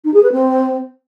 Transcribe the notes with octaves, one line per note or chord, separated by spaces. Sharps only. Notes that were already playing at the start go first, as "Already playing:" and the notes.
D#4
G#4
B4
C4